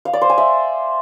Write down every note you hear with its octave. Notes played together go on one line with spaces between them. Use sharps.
F5
D5
C5
G#5
E5